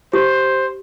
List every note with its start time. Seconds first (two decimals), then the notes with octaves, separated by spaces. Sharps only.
0.13 G4 C5